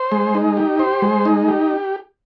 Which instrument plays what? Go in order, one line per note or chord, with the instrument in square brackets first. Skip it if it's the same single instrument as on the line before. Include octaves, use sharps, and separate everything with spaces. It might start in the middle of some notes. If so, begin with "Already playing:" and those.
Already playing: [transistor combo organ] C5
G#3
D#4
G4
C5
G#3
D#4
G4